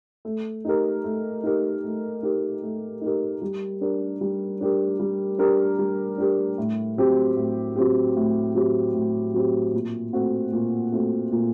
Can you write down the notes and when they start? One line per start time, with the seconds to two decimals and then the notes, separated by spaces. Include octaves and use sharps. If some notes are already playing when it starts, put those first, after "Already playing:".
0.25 A3
0.65 D#4 G4 A#4
1.04 A3
1.43 D#4 G4 A#4
1.84 A3
2.23 D#4 G4 A#4
2.63 A3
3.01 D#4 G4 A#4
3.42 G3
3.81 D4 G4 A#4
4.21 G3
4.61 D4 G4 A#4
5.00 G3
5.38 D4 G4 A#4
5.79 G3
6.18 D4 G4 A#4
6.58 A2
6.98 F#3 C4 G4
7.36 A2
7.76 F#3 C4 G4
8.16 A2
8.55 F#3 C4 G4
8.94 A2
9.34 F#3 C4 G4
9.73 A#2
10.13 A3 C4 F#4
10.52 A#2
10.92 A3 C4 F#4
11.32 A#2